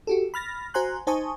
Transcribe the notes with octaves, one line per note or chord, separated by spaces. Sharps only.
F#4 G4 A4
B5 F6 A6 A#6
F#4 C5 G#5 A#5 C6 F#6
D#4 C5 G#5 A5 C#6 D#6